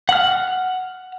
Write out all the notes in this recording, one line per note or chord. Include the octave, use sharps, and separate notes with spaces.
F#5 F6